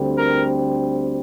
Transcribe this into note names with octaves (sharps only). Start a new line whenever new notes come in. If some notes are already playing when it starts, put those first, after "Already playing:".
Already playing: D2 D3 G3 C4
A#4